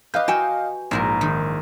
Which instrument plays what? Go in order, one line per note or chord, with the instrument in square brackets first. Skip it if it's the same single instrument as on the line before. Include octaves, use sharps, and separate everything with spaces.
[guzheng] G4 B4 [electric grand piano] D#5 F5 G6
[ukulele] F#4 G#5 [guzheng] E5 G5
[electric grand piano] A#1 [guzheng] G#2 E4 A#4
[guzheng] D#3